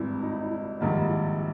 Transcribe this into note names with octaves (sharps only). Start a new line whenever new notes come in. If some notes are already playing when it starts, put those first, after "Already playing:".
Already playing: G#1 G2 E3 E4
D#4
E4
D#4
E4
A#1 G#2 D#3 G3 A#3
E4